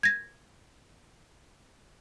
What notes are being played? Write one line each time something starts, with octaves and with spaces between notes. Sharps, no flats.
G#6 A#6